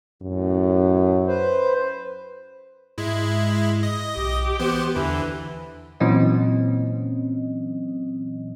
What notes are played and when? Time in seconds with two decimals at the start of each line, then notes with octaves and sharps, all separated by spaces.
0.22 F#2 A2
1.27 B4 C5
2.98 G#2 G#3 E4
3.83 D#5
4.17 B1 G4
4.60 E3 B3 C5
4.96 E2 D3 E3
6.00 A#2 E3 F#3 C4 C#4 D#5